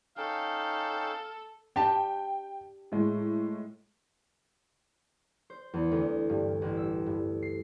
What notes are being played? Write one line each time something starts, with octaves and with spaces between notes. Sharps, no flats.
C#4 D#4 A4 F5 G5
D4 G4 G5 A5
A2 G#3
C5
E2
D2
G2
A1
E6
G2
C7